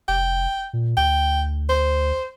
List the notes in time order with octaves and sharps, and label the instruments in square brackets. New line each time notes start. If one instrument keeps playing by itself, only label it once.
[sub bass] F1 [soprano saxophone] G5
[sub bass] A#2
[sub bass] D2 [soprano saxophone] G5
[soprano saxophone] C5